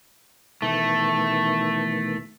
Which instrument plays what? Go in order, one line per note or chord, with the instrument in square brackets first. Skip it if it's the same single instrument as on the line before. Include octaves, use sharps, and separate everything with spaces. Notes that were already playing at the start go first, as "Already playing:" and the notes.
[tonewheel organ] B2 D#3 E3 [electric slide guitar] A3